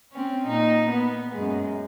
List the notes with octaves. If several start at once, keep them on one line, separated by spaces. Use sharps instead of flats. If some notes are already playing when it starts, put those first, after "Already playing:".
C4 C#4
A#2 D#4
B3
F#2 G#3